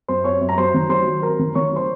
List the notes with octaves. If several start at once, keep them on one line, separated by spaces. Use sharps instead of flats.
F#2 C5 C6
C4 C#5 C#6
F#2
A#5
F#3 C5 C6
D#3
F#3 C5 C6
F#3
C4 A#4 A#5
D#3
D#3 C#5 C#6
F#3
C5 C6